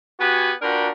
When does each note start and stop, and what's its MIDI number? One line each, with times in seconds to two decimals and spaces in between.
0.19 0.52 59
0.19 0.52 66
0.19 0.52 67
0.19 0.52 71
0.19 0.52 80
0.62 0.89 46
0.62 0.89 62
0.62 0.89 66
0.62 0.89 70
0.62 0.89 71
0.62 0.89 79